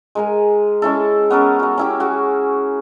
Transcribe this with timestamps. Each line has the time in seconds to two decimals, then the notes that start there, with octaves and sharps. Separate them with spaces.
0.15 G#3 A#4 G#5
0.82 G#3 C#4 E4 A4
1.30 B3 C#4 A4 A#4
1.59 F#4 A#5
1.77 C#4 E4 G4
2.00 F#4 G#4 G#5